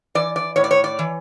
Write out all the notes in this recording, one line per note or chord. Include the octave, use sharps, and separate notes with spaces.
E3 D5
D5
A2 C#5
D5
C#5
D5
E3